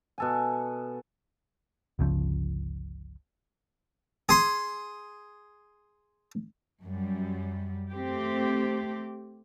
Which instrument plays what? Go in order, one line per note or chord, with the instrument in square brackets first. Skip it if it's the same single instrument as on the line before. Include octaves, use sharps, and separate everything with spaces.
[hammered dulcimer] B2 A4 G#5
[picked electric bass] G1 C#2 C#3 F3
[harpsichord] G#4 C6
[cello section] F#2 G3
A3 C4 G4